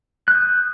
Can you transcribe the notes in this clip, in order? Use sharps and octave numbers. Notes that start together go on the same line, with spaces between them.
D#6 F#6 G6